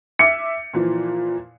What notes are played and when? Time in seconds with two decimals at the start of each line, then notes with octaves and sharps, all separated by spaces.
0.19 E5 D6 C#7
0.74 A#2 E3 F3